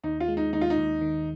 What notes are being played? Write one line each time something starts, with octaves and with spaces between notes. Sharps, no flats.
D#2 D#4
F4
G#3
D#4
D#2 D#4
F4
D#4
D#2
D#3